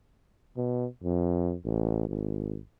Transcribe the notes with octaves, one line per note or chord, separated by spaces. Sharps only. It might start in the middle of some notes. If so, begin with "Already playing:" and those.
B2
F2
A1
G#1